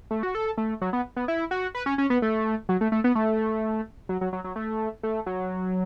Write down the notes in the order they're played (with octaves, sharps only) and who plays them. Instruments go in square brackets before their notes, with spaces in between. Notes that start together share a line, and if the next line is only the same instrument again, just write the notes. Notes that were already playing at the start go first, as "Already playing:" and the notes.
[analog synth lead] A3
F#4
A4
A3
F#3
B3
B3
E4
F#4
B4
C#4
C#4
B3
A3
F#3
A3
A3
B3
A3
F#3
F#3
F#3
F#3
A3
A3
F#3